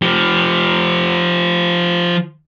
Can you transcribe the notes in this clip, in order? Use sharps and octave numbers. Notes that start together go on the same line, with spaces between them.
F3 G4